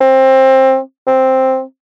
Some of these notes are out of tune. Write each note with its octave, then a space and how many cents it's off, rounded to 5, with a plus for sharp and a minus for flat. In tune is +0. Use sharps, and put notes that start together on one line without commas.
C4 +20
C4 +5